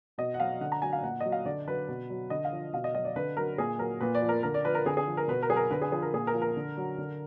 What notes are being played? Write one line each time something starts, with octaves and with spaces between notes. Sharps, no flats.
B2 D#5
F#5
F#3 F5
D3 F#5
A#5
F#3 G#5
F5
A#2 F#5
F#3 D#5
F5
D3 D5
F#3 B4
B2
F#3
D3 D#5
F5
F3
B2 F5
D#5
F#3 D#5
D5
D3 B4
F#3 A#4
A#2 G#4
F#3 A#4
A#2 B4
D5
F3
A#4
D3 A#4
D5
F3 B4
A#4
D3 G#4
G#4
F3
A#4
B2 B4
A#4
F#3 G#4
A#4
D3 B4
G#4
F3 G#4
A#4
A#2 G#4
A#4
F3
A#4
D3
F#3
D3